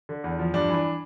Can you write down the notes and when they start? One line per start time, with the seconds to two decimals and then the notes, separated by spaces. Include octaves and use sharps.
0.09 D3
0.24 E2
0.39 F3
0.54 G2 D4
0.69 E3
0.74 D4